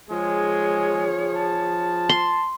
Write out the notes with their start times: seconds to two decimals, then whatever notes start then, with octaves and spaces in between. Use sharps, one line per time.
0.10 F3 G#3 G#4 C#5
1.36 A5
2.09 C6